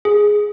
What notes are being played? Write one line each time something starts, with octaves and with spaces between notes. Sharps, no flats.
G#4